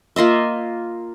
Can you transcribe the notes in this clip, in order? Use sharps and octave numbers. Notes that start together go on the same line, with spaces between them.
A#3 F4 D#5 E5